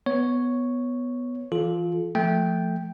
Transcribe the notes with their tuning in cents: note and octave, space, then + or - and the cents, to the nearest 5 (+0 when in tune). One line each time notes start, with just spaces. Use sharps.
B3 +0 C#5 +0
E3 +25 F4 +5 A4 -35
F3 -10 A3 +0 G5 +0